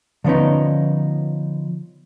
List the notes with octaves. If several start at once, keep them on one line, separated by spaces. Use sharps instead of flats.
D3 F3 B3 C#4 D#4